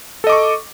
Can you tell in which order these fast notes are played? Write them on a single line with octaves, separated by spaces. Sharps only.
A4 D#5 D6 C#6